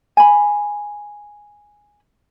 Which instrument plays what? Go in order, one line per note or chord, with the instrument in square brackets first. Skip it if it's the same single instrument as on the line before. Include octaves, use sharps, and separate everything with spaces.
[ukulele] G#5 B5